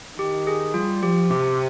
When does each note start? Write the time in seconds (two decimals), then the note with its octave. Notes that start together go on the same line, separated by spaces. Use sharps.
0.19 D#3 G4
0.47 G#4
0.74 G3 F4
1.02 F3 G4
1.31 C3 G4